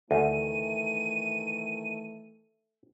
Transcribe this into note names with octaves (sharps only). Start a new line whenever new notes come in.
D2 D#3 E3 A3 A4 E5 G#5 D#7